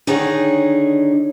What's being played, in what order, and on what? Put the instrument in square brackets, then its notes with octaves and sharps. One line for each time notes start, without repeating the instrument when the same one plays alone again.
[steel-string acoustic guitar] D3 D#3 D#4 G#4 C#5 F#5